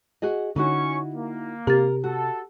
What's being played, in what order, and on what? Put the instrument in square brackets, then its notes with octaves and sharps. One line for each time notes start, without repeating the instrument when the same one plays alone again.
[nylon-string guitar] F#4 G#4 D#5
[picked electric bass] D3 [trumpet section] C#4 C#6 [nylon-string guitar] D#4 E4 F#4
[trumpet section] A#3
[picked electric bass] C3 [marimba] G4 A6 [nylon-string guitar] A#4
[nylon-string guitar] F#4 [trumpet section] A4